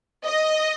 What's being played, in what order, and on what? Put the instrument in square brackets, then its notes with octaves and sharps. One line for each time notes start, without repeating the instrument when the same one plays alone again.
[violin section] D#5